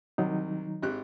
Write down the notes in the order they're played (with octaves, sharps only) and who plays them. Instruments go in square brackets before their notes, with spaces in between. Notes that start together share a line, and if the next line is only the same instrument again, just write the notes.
[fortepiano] C2 [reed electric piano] D#3 F#3 D#4
[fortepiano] G#1 G4 F#6